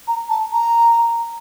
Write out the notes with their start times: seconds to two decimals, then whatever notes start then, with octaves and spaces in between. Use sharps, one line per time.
0.07 A#5
0.29 A5
0.52 A#5